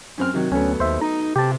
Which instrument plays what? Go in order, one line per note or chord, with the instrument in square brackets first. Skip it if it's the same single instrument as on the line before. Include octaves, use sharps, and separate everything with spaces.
[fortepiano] F#2 C4 F6
C3 D#3 F#3
[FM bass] D2 [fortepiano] F#3 A3 B3 [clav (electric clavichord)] C#4 C#5
[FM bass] D#2 [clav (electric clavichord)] C5 E5
[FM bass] D#4 [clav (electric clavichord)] A#5
[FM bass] C3 [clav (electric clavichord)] G4 A5